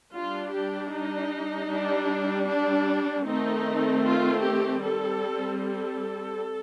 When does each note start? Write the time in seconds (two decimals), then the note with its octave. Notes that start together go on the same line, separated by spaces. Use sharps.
0.14 G3 D4 F4
0.53 G4
0.92 D#4
1.70 G3 D4
2.49 D4
3.26 D#3 A3 C4 D#4
4.05 F4
4.43 G4
4.83 G3 C4 A4
5.60 A4